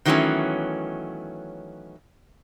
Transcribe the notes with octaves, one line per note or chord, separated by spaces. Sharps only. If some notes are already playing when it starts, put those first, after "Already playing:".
D#3 E3 F#3 A3 B3 C#4